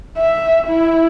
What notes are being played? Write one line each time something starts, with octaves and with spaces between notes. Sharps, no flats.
E5
E4